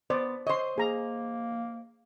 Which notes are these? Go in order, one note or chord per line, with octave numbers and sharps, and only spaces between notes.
B3 C5 D5
C5 C#5 D#5 C6
A#3 G#4 A#5